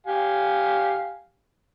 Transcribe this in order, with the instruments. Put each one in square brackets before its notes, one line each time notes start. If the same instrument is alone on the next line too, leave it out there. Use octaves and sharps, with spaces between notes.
[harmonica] G4 F5 G#5